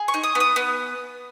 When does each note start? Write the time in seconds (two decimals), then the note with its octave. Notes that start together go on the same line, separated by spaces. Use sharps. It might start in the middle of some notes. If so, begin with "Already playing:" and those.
Already playing: G#4
0.08 C#6
0.14 D#4
0.23 D#6
0.35 B3
0.40 D#6
0.56 B3